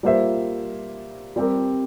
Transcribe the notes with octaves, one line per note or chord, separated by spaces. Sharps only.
G3 A#3 F4 C5 E5
G3 C4 G4 A#4